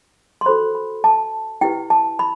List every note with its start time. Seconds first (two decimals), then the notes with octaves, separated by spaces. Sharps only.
0.41 C6
0.46 F#4 A4 C5 B5
0.75 B5
1.04 A5
1.61 E4 G4 B4 G5
1.90 A5
2.19 B5